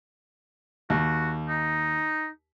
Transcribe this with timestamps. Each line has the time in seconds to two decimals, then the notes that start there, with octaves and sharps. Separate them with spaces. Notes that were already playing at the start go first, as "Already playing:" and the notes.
0.90 D#2 F#4
1.48 D#4